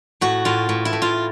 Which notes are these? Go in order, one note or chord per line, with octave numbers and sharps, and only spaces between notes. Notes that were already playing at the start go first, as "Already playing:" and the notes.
A2 F#4
A2 F4
A2
E4
A2
F4